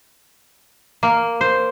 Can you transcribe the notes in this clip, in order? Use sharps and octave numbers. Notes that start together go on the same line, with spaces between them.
A#3
C5